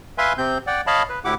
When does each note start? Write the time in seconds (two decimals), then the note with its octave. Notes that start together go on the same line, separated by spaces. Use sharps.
0.18 B4 E5 F5 G#5 C6
0.38 C3 C4 G6
0.67 D5 F#5 G5
0.87 C#5 D#5 F5 A5 B5
1.09 B4
1.25 D2 A2 E4 G4 F#5 D6